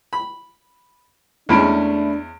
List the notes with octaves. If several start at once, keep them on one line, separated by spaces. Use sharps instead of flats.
B5
E2 G#3 A3 C#4 D4 B5 D7